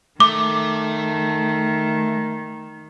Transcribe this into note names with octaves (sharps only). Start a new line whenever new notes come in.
D#3 A3 D6